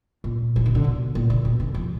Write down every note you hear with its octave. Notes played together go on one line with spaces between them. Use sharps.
A#2
F3
D#3
D3
B2
A#2
D3
B2
D3
F3